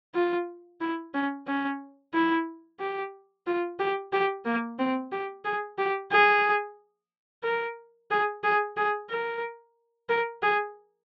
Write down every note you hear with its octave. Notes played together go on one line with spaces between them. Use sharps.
F4
E4
C#4
C#4
E4
G4
F4
G4
G4
A#3
C4
G4
G#4
G4
G#4
A#4
G#4
G#4
G#4
A#4
A#4
G#4